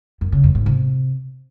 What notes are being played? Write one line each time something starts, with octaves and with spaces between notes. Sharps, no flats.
F#2
C#3
F#2
G#2
C3